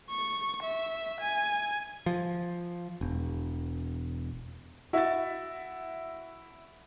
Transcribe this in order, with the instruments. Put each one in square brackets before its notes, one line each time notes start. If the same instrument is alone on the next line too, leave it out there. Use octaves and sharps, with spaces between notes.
[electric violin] C#6
E5
G#5
[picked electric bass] F3
E1
[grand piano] E4 E5 [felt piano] F#4 A6